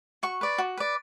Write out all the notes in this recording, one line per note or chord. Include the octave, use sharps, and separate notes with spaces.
F#4 C#6
B4 D5
F#4
B4 D5